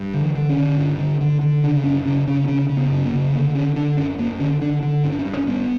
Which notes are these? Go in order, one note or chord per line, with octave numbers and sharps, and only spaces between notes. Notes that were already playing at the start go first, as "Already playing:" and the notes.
Already playing: G2
D3
E3
D3
C#4
D3
G2
D3
D3
D3
C#3 D4
F#2 C#4
C#3 C#4
C#3 C#4
B3
C#3 C#4
C#3
B3
F#2
A#3
C#3
D3 A#3
D3 C#4
D3 D4
F#2 C#4
F#2 A#3
D3 C#4
D3 D4
D3
G2 C#4
D4
C#4
G2
C#4
G2 B3